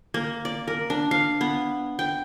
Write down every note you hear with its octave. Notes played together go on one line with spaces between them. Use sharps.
A#3
D5
A#4
D4
F5
B3
G5